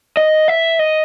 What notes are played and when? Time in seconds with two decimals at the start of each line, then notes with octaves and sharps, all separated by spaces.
0.17 D#5
0.48 E5
0.79 D#5